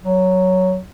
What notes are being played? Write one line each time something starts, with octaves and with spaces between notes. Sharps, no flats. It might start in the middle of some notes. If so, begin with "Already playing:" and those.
F#3